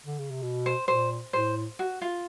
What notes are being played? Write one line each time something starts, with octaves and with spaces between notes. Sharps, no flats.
D3
C#3
C3
B2
C5
A#2 C5
A2 C5
F#4
F4